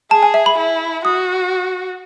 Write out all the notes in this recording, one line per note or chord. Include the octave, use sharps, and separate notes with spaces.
G#4 A5
G#5
E5
B5
E4
F#4 D#6